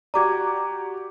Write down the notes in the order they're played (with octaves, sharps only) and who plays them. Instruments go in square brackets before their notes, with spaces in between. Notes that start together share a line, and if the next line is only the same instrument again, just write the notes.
[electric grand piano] F#4 G4 D5 [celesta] A#5 D6 G#6